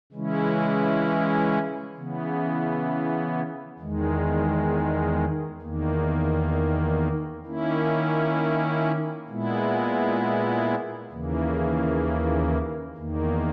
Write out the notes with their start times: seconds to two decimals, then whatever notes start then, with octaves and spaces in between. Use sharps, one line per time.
0.12 C#3 E3 G#3 C#4 E4
1.96 C#3 E3 B3
3.79 E2 D#3 G#3
5.62 E2 D#3 A#3
7.45 D#3 A#3 C#4 E4
9.29 A#2 G#3 B3 E4
11.11 D#2 C#3 E3 A#3
12.95 E2 D#3 A#3